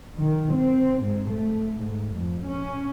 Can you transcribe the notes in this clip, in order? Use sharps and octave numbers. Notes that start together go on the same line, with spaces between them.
D#3
C4
G#2
A3
G#2
F2
C#4